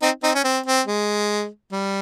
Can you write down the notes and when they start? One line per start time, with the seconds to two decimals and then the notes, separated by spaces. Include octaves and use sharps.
0.02 C4 D#4
0.23 C4 D#4
0.35 C#4
0.44 C4
0.66 C4
0.87 G#3
1.72 G3